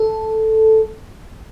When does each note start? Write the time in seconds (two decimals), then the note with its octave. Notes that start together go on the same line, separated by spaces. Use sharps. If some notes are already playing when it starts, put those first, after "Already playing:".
Already playing: A4